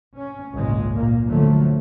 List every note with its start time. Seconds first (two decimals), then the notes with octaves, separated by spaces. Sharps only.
0.17 C#4
0.53 G#1 C#2 A#2 G#3
0.96 A#2 A#3
1.28 D3 F3 F#3 A3